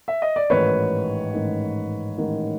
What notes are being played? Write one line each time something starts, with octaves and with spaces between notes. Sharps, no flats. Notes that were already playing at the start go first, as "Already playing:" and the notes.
E5
D#5
D5
A1 G#2 D#3 B4 C#5
A1 G#2 D#3
A1 G#2 D#3